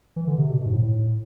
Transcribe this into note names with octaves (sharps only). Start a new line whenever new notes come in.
E3
D3
C3
B2
B2
G#2
A2
A2